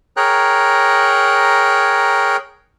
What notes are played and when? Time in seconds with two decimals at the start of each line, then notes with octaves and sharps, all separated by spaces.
0.17 G#4 A#4 C#5 G5 A#5 F#6